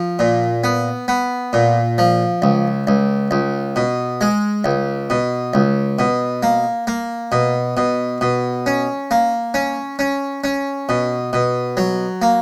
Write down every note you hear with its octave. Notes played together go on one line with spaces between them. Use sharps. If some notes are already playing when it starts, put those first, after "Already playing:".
Already playing: F3
A#2
B3
B3
A#2
F3
C#2
C#2
C#2
B2
G#3
C#2
B2
C#2
B2
A#3
A#3
B2
B2
B2
C#4
A#3
C#4
C#4
C#4
B2
B2
F#3
A#3